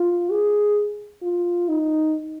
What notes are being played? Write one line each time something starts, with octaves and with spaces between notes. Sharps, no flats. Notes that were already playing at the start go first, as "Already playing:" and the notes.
Already playing: F4
G#4
F4
D#4